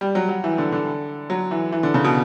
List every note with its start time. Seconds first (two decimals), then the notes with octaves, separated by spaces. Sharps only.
0.01 G3
0.15 F#3
0.29 F#3
0.44 E3
0.58 D3
0.72 D3
1.30 F#3
1.51 E3
1.72 E3
1.83 D3
1.94 C#3
2.04 B2